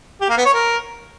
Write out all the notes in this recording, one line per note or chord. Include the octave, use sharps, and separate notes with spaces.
G4
A#3
B3
C#5
A#4